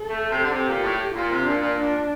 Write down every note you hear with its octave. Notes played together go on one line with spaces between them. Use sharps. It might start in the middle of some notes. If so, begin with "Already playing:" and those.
Already playing: A4
A3
C3
D3
C3 G4
A#2
A2
A#2 F4
C3
A#2 D4
A#2
A#2 D4